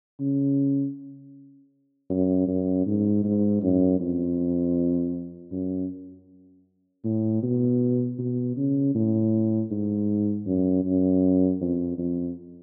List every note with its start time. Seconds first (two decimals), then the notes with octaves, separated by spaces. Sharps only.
0.20 C#3
2.10 F#2
2.47 F#2
2.87 G#2
3.24 G#2
3.63 F#2
4.00 F2
5.52 F#2
7.05 A2
7.43 B2
8.19 B2
8.57 C#3
8.95 A2
9.71 G#2
10.47 F#2
10.85 F#2
11.61 F2
11.98 F2